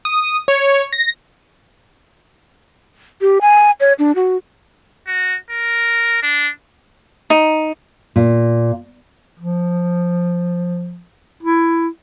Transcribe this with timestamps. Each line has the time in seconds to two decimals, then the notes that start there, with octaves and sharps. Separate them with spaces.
0.05 D#6
0.48 C#5
0.93 A#6
3.21 G4
3.41 G#5
3.80 C#5
3.99 D4
4.15 F#4
5.07 F#4
5.51 A#4
6.22 D4
7.30 D#4
8.16 A#2
9.39 F3
11.43 E4